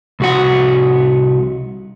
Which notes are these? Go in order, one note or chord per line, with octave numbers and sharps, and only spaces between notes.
C2 F#4 F#5